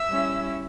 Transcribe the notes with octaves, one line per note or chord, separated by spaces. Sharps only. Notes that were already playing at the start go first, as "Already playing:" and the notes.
Already playing: E5 E6
G3 C#4 E4